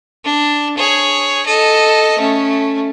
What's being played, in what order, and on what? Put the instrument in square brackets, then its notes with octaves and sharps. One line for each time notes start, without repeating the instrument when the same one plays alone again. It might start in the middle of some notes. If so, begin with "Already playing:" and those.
[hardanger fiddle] D4
G#4 C#5
A4 D#5
A3 C#4